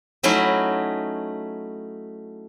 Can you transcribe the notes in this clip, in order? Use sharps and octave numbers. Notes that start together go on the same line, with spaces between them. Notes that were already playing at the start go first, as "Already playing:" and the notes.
F#3 A3 C#4 D#4 E4